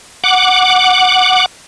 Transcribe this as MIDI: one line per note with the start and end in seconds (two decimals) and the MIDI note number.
0.24 1.46 78
0.24 1.46 86